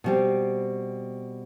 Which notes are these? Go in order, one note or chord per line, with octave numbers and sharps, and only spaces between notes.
B2 G3 C4